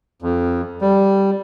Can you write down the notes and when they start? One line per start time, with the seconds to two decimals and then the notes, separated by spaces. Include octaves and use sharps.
0.22 F2
0.81 G3